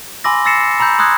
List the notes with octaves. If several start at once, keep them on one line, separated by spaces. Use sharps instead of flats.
G#5 B5 C6 D6 E6 A#6
E6 A6 A#6 C7 C#7 E7
A#5 B5 E6 G6
C6 D#6 E6 F#6 G#6